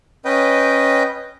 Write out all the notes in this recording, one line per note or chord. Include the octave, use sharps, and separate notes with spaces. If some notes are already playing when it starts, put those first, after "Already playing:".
C#4 B4 D#5 G5